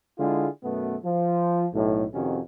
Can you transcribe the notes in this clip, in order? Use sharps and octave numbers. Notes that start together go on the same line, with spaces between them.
D3 G#3 E4 F4 G#4
F#2 B2 A3 B3
F3
B1 A2
F2 C3 D#3 C#4 F#4